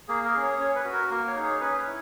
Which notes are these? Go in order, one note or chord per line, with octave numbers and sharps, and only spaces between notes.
A#3 G#4
A#4
C#4 G#4
C#5
C#4 C#5
B4
F#4
A#4
A#3 A#4
C#5
D#4 G#4
C#5
C#4 B4
C#5
E4